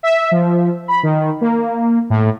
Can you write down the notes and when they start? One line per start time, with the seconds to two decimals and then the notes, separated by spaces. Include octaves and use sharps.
0.03 E5
0.31 F3
0.88 B5
1.03 D#3
1.41 A#3
2.10 A2